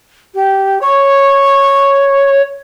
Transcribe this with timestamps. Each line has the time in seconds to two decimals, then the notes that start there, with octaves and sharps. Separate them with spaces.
0.35 G4
0.81 C#5 C#6